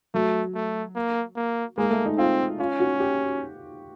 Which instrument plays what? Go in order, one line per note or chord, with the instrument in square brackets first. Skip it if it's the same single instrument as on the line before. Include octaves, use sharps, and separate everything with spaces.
[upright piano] F#3 [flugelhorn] A3
[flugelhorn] A3
A#3
A#3
[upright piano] G#3 [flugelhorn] A#3
[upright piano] A3
D#4
[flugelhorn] C4 [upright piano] F4
[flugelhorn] C#4 [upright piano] F4
[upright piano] F#4
G4